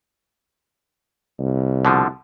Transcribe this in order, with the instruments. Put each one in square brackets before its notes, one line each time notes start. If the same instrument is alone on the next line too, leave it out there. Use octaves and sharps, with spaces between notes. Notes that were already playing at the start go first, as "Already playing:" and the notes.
[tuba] C2
[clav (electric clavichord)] B2 D3 F3